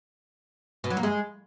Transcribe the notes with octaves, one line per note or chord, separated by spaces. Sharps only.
B2
F#3
A#3
G#3